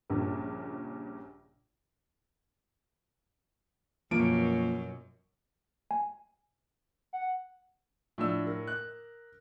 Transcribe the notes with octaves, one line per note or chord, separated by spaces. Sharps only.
A#1 G2 A#2 C#3
F#2 B2 F3 A#3 D7
G#5
F#5
A2 F3 D4 D5 E6
A#4
F#6